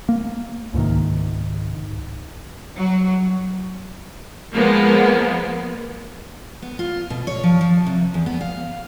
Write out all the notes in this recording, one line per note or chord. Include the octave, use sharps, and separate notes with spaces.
A#3
C#2 G#2 C3 D#3
F#3
F3 G#3 A#3 B3
B3
F4
B2
C#5
F3
F3
C3
E2
B3
F5